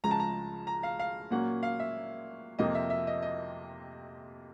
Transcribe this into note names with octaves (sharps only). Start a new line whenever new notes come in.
C#2 C#3 F3 G#3 A#5
A5
A#5
A#5
F5
F5
A#2 F#3 A#3 C#4 F#5
F5
E5
F2 C3 F3 A#3 D#5
E5
E5
D#5
D#5